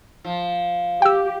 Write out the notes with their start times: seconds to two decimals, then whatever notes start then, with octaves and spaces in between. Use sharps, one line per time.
0.24 F3
1.02 G4 G5 E6